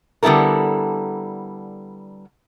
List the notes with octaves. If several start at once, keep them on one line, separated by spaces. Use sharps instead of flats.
D3 G3 B3 E4 A4 A#4